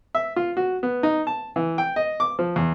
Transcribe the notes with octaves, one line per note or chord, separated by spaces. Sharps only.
E5
F4
F#4
B3
D#4
A5
E3
G5
D#5
D6
F3
E2